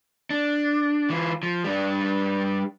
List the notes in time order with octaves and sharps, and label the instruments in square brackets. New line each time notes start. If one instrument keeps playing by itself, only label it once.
[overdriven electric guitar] D4
E3 F4
F3
G3 D4